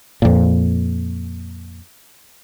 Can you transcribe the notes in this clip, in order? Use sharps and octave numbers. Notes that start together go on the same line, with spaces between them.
F2 A#2